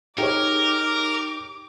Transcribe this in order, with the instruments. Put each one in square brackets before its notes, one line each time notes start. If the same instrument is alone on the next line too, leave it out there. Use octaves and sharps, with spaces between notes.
[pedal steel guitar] D#4 [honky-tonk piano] G4 G#4 C#5 [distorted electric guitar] A#4 [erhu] D6